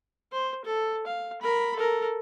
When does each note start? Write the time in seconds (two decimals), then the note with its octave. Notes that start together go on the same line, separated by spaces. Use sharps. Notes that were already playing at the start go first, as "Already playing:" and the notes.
0.33 C5
0.65 A4
1.07 F5
1.42 A#4 B5
1.76 A4 A#4